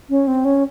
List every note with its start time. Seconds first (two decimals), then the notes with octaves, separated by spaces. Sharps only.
0.10 C#4
0.27 C4
0.45 C#4